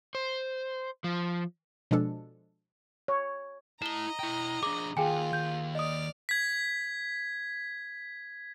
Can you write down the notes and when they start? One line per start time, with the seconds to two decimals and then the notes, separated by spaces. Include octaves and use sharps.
0.15 C5
1.04 F3
1.91 B2 F3 G#3 D4 A4
3.08 C#5
3.82 E4 D#5 A5 A#5 E7 G7
4.19 E4 G5
4.63 D4 G#4 D6
4.97 D#2 F4 G#4 G5 G#5
5.33 D#2 G6
5.75 D5 D#5 D#6 F6
6.29 G#6 B6